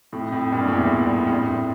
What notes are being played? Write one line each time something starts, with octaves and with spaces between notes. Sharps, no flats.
F2 A2
F2 A2
G2 A#2
A2
E2 G2
F2
G2
F2 A2